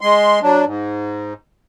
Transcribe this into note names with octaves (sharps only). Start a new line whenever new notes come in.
G#3 C6
F#3 D4
G#2